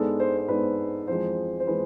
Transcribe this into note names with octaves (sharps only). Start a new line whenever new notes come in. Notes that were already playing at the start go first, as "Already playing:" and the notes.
Already playing: G#2 G#3 B3 D4 A4
C5
C5
G#2 G#3 B3 D4 B4
F2 E3 G#3 C5
C5
E3 G#3 B4